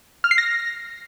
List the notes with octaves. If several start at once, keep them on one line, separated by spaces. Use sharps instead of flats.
F6
C7
A#6